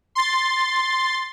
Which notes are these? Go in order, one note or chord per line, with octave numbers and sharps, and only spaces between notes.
C6 A6